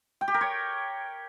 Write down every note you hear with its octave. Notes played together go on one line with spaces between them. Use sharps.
G5
G4
A#4
C#5